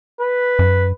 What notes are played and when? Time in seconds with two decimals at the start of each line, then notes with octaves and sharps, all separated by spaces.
0.21 B4
0.59 F#2